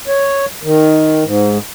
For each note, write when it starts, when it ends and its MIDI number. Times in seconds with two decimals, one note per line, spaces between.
0.08 0.46 73
0.63 1.24 51
1.25 1.58 44